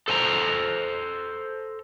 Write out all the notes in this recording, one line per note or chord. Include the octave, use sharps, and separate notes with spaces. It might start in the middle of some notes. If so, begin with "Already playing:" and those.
A4 C5 G#5 A#5